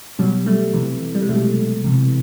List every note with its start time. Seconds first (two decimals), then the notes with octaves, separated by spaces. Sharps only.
0.19 B2 F#3 G3
0.46 G3 A3
0.73 C3 E3
1.15 G3
1.22 G#3
1.29 B2 F#3 G3 A3
1.84 C3 E3